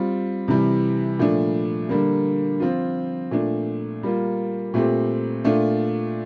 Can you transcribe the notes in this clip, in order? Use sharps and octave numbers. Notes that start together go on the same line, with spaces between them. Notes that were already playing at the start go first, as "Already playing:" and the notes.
Already playing: G3 C4 F4
C3 E3 G3
A#2 F3 A3 D4
D3 G3 A#3
F3 C4 F4
A#2 A3 D4
G3 A#3 F4
A#2 A3 C4 G4
A#2 A3 D4 F4